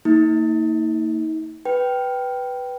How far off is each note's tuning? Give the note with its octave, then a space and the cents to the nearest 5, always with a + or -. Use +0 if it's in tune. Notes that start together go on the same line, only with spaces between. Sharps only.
A#3 -30 D#4 +40
B4 +0 G5 -10